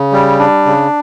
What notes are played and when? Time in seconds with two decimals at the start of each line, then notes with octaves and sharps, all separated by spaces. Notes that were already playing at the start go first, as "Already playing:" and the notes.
Already playing: C#3
0.12 G3
0.39 D4
0.66 C#3